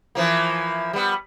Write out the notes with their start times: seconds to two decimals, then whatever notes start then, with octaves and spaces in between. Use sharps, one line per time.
0.15 E3 F3 A#3
0.93 G3 B3